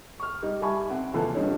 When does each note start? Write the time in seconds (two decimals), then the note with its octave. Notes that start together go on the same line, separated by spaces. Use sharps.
0.20 C#6 F6
0.42 G3 D#4
0.62 G3 E5 G#5 A5 B5 C#6
0.90 C4 F#5
1.13 D#2 A#2 E3 F3 A4 A5
1.35 G2 C#3 G3 D#4 C#5